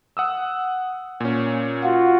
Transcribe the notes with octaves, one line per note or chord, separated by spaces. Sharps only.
F#5 D#6 E6
A#2 C#4
F4 F#4